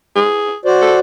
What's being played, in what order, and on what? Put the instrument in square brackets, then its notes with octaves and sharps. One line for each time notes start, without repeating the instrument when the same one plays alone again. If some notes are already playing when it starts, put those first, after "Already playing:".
[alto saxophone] G#4
[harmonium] F#4 C5 D5
[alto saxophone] A4